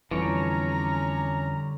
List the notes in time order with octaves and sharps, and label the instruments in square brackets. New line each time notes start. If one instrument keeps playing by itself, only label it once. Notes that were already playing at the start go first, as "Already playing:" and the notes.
[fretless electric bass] F2 E3 [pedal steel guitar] D3 G3 C#5 [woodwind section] C#4 A#5